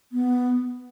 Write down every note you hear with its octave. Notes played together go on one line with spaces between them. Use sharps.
B3